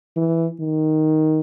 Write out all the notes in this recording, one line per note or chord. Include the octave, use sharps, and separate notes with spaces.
E3
D#3